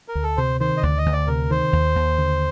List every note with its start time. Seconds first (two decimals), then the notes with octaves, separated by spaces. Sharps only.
0.08 A#4
0.15 D2
0.23 A4
0.37 C3 C5
0.60 D#3 C5
0.77 D#5
0.83 D2 D5
0.98 D#5
1.06 D2
1.13 D5
1.27 C3 A#4
1.50 D#3 C5
1.73 D#2
1.95 D#2
2.18 D3